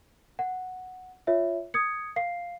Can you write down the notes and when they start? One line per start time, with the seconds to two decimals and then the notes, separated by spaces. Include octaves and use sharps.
0.39 F#5
1.27 F4 C#5 E5
1.74 D#6 G#6 C#7
2.16 F5 C7